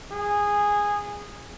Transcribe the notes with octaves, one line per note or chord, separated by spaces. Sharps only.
G#4